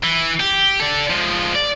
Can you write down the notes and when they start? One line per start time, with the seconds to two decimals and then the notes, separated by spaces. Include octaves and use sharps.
0.03 E3
0.40 G4
0.80 A4 D5
1.10 F3 G#3
1.55 D5